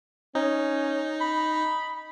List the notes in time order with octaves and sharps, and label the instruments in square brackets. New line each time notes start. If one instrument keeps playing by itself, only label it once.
[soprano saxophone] C#4 [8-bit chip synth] D#4
[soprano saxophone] B5